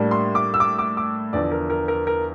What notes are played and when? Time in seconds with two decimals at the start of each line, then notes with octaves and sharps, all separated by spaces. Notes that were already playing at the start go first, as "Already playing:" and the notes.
Already playing: A2 G3 A#3 D4
0.11 C6
0.35 D6
0.54 E6
0.60 D6
0.79 D6
0.97 D6
1.33 E2 D3 F3 D5
1.51 A#4
1.70 A#4
1.88 A#4
2.07 A#4